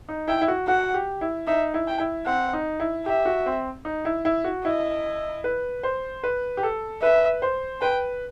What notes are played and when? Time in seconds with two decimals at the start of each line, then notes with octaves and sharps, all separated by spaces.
0.09 D#4
0.28 E4 G5
0.41 E4
0.48 F#4
0.67 F#4 F#5
0.94 G4
1.21 E4
1.47 D#4 E5
1.74 E4
1.87 G5
2.00 E4
2.26 C4 F#5
2.53 D#4
2.80 E4
3.06 G4 E5
3.26 F#4
3.46 C4
3.85 D#4
4.05 E4
4.25 E4
4.44 F#4
4.64 E4 D#5
5.44 B4
5.83 C5
6.24 B4
6.57 G4
6.63 A4
7.02 B4 E5
7.42 C5
7.81 B4 G5